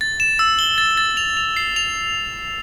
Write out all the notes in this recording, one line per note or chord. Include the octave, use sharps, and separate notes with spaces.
A6
E7
E6
G7
A6
A6
F7
F7
C7
F7